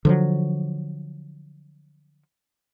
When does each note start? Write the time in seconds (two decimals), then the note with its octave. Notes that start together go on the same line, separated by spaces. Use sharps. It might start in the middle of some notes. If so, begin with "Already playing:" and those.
0.05 D3 F3 F#3